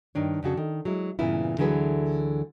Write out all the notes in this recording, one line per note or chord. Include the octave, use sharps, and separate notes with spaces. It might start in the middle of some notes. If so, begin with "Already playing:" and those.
G2 D#3 D4 C#5
F2 C#3 F#4 A4
D#3
F#3 G#3 E4
G2 A#2 C#3 E3 B3 E4
D2 D3 E3 F#3 G#4 B4